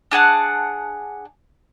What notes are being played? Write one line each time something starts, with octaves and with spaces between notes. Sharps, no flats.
D4 G#4 F#5 A5